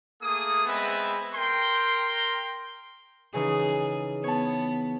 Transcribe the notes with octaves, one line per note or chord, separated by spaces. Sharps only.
A3 A#3 G#4 D#6
G#3 B3 C4 B4 E5
A#4 G5 C6
C#3 E3 D#4 G#4
B3 C#5 A5